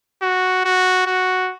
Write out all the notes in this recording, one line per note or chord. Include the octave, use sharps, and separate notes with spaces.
F#4
F#4
F#4